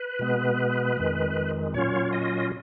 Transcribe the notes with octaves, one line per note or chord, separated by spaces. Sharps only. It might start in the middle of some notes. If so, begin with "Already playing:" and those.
Already playing: B4
B2 G#3 B3
F2 D#3 G#3
A#2 F#3 C#4 F4 C#5
D#5